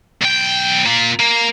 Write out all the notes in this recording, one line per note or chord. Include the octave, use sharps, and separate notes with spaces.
B1 G5
A#3 F4
A#3